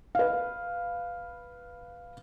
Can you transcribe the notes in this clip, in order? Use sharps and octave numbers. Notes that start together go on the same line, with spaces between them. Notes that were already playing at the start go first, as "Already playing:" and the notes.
B4 F5